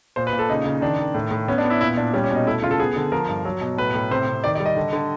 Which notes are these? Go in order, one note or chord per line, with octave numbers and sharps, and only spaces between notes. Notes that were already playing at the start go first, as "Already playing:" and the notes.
A#2 C5
B4
A#2
A4
C#3 D#4
C#3
D#3 D4
D#3
A2
A2
B3 C#4
D4
B3
E4
A#2 E4
A#2 D4
G3 C#4
C#4
B2 D#4
A3 E4
C#3 F4
A4
B3 G#4
D3
F3 A#4
G2
F#3
B2
A2 B4
A2
C3 C5
C3
D#3 D5
D5
G3
D#5
D3
D3